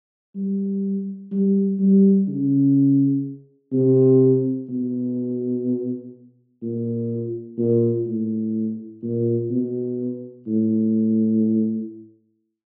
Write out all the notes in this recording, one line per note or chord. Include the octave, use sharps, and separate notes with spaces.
G3
G3
G3
C#3
C3
B2
A#2
A#2
A2
A#2
B2
A2